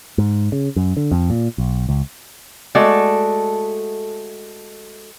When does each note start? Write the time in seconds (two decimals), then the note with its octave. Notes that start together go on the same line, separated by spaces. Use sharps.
0.18 G#2
0.52 C#3
0.76 F#2
0.97 D3
1.12 F2
1.30 A#2
1.58 B1
1.89 C#2
2.75 G#3 A3 F#4 A4 D5